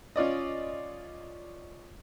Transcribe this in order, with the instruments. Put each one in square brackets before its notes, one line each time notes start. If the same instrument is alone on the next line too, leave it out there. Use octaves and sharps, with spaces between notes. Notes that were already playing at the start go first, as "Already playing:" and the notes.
[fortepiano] C#4 F4 D5 D#5